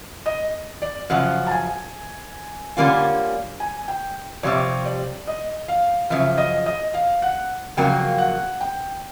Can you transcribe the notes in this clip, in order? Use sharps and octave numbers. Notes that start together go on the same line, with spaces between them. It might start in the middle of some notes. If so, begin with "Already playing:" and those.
D#5
D5
F#2 C#3 F3 F#5
A5
G#5
D3 G3 A#3 C#4 F4
G#5
G5
F2 C3 G3 C#5
D5
D#5
F5
F#2 C#3 F3 E5
D#5
D#5
F5
F#5
F2 C#3 F#3 A#3 G5
F#5
G5